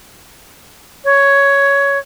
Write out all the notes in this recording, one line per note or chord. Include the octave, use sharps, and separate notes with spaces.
C#5